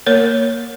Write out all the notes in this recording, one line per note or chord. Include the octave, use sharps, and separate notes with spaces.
A#3 A#4 C#5